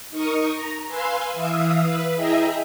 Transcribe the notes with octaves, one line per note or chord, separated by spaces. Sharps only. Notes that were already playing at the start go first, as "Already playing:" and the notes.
D#4 A#4 C#6 D#6
A#5
B4 F5 G#5 C6 E6
E3 E5 F5 D#6 E6
B4
E4 G#4 D#5 E5 G5 A#5